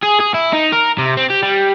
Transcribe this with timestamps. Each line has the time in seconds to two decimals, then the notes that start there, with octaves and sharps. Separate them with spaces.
0.03 G#4
0.20 G#4
0.34 E4
0.53 D#4
0.72 A#4
0.98 C3
1.17 C4
1.30 G4
1.43 G3